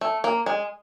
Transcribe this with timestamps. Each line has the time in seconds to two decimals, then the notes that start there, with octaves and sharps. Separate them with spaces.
0.01 A3
0.24 A#3
0.46 G#3